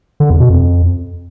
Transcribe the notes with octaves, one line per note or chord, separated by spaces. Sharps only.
D3
E2
B2
F2